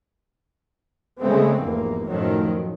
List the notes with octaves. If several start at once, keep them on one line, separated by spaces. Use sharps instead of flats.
C#3 G#3 A3 B3 C4
F1 E2 G#2 A#3
F#2 A2 D#3 F3 F#3